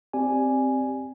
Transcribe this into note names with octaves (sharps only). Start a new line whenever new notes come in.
C4 G4 D5 G#5